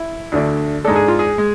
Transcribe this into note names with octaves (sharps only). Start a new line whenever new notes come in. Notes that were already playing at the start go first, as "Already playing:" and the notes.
Already playing: E4
D2 D3 A3 D4
G#2 G#3 D4 A4
G#4
F4
G#4
G#3